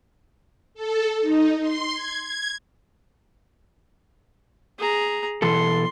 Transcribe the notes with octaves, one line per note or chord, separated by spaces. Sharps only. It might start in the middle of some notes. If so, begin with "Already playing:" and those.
A4
D#4
C6
G#6
G#6
G#4 A#5
B2 E3 A4 C6